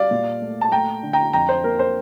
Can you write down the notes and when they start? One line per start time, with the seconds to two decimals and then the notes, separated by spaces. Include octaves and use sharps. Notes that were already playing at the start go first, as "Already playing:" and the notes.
Already playing: G3 D5 F5
0.11 A#2
0.42 A3
0.61 A5
0.72 A3 G5 A#5
1.03 D3
1.13 G5 A#5
1.33 F2 G5 A#5
1.49 C5
1.64 A#3 A#4
1.79 C5